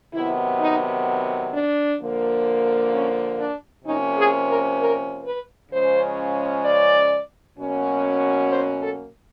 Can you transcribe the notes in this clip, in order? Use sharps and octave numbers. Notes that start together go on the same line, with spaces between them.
C3 D#3 F#3 B3 E4
D#4
D4
D3 F3 A#3
C#4
D4
C3 F3 A#3 C#4 D#4
G#4
A#4
A#4
B4
C#3 F3 G#3 C#4 C5
D5
B2 F#3 A#3 C#4
C5
A4